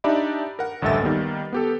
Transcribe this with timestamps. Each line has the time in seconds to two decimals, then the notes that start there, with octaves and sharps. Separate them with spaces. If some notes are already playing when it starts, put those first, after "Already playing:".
0.04 D4 D#4 G4 D5 E5 B5
0.59 A#4 F#5
0.82 A1 D2 G2 A4 E5 A6
1.02 D#3 G3 A#3 B3
1.53 B3 G4 A4